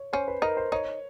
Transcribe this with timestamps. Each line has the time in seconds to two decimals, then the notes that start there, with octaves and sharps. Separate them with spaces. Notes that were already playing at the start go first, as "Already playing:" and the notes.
Already playing: C#5
0.13 C#4 C5
0.28 B4
0.42 D#4 A#4
0.57 C5
0.72 D#4 C#5